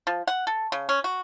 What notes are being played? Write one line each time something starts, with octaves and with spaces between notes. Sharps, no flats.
F3
F#5
A4
C#3
C#4
F#4